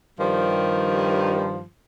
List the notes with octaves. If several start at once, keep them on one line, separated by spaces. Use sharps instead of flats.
G2 D#3 F3 G3